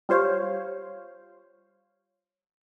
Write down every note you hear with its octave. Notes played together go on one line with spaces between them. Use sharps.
G3 F4 C5 C#5 F5